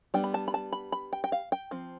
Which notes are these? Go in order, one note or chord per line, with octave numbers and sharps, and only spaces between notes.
G3 B3 D4 G5
B5
A5
B5
A5
B5
B5
G5
G5
F5
G5
F3 C4